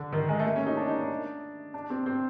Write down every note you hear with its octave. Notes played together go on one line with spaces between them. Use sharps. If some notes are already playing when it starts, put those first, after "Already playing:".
Already playing: D3
D#3
G#3
A3
A#3
C#4
D#4
D4
D#4
D4
D4
C4
C4